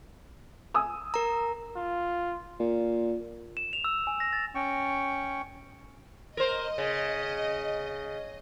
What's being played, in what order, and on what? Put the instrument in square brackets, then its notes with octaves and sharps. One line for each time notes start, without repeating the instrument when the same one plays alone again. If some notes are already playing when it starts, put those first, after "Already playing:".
[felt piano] G#5 D#6 E6
[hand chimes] A#4 A#5
[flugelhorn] F4
[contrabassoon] A#2
[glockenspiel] E7
F7
E6
G#5
A#6
A6
[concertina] C#4 G5 C#6
[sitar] A#4 C5 [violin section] D#5
[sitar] C#3